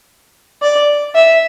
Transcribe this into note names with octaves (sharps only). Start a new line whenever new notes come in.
D5
E5